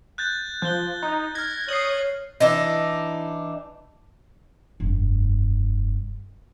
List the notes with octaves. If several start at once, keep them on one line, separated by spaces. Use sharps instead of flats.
F#6 G6 A6
F3 F#6 G6 G7
D#4
F6 G#6 A#6
C#5 D#6 C7 F#7
E3 D4 D#4
F1 G2